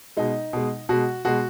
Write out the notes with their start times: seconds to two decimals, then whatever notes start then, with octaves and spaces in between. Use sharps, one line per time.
0.17 B2 G#3 D#4
0.53 B2 G#3
0.89 B2 G#3 F#4
1.25 B2 G#3 F#4